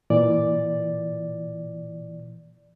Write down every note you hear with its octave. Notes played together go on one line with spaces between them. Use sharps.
A#2 E3 D5